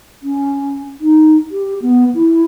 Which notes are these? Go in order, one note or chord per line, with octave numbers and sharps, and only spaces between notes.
C#4
D#4
G4
B3
E4